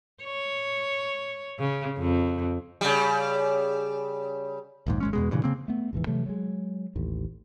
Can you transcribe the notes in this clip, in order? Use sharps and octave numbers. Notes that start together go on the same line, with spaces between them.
C#5
C#3
F2
C#3 G3
A#1 D#2 G#2
G#1 G#3 C#4
E2 B2 G#3
G2 A#2 C#3 E3
C#3 A#3 C4
A3 B3
F1 A#1 G#2 E3
C3 E3 F#3 A3
F#3 G#3
A1 D#2